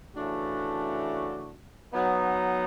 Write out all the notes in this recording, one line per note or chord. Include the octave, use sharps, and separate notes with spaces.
C#3 E3 A3 D4 F#4
F#3 B3 D#4